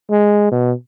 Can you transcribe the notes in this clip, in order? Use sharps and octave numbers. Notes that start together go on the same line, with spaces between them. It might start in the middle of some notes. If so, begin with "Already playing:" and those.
G#3
B2